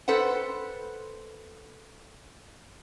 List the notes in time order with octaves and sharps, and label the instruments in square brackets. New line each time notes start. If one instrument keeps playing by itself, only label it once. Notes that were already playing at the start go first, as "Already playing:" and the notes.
[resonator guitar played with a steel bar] A4 B4 C5 F#5